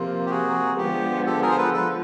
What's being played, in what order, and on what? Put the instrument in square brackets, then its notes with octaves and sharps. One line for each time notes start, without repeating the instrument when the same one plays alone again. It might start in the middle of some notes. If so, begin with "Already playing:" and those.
Already playing: [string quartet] C3 F3 A#3 [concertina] F4
[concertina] G4
F#4 G#4
[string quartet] D3 F3 G#3 B3 [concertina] G4
[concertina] G4 A4
G#4 A#4
C5
A4 B4
[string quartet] F3 [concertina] A4 B4